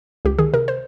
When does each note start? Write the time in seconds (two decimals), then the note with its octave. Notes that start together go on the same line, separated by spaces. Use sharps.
0.25 C#2 G4
0.39 D#3 G#4
0.53 C3 A#4
0.68 C5